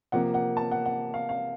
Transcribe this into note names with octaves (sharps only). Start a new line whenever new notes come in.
C3 F3 A#3 F#5
F#5
A5
F#5
F#5
F5
F5